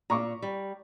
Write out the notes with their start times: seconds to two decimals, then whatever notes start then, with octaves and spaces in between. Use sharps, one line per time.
0.10 A#2 A#5 C#6 D6
0.42 G3